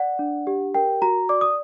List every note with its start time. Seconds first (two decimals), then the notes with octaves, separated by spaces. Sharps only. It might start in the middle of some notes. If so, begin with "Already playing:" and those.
Already playing: D5 F#5
0.19 D4
0.47 G4
0.75 A#4 G5
1.02 F#4 A#5
1.29 D5 D6
1.41 D#6